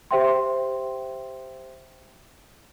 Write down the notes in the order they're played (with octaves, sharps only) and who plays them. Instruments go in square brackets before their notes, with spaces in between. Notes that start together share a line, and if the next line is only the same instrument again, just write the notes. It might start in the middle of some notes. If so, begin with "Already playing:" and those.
[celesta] G4 C5 E5 G5 C6